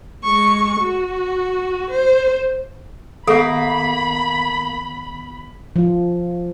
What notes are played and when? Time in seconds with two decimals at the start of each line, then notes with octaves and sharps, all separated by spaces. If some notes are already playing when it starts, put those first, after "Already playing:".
0.24 G#3 C#6
0.80 F#4
1.91 C5
3.27 D#3 A#3 B3 A4 B5
5.76 F3 F4